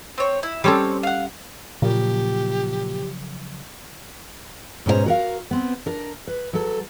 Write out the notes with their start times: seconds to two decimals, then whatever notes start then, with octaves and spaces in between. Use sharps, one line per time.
0.18 C4 C#5
0.43 E4
0.64 G3 C4 C#4 A4 C#5 D6
1.03 F5 F#5
1.82 A#2 C#3 F3 F#3 G4
4.86 G#2 B2 C#4 A#4 C5 A#5
5.06 F#4 A#4 F5
5.51 B3 C4
5.86 D4 A#4
6.27 B4
6.53 F#3 A4